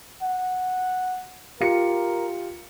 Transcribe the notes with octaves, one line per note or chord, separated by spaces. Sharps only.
F#5
F4 G4 A#4 C#7